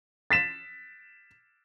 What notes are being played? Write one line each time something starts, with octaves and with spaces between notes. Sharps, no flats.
A6 B6 E7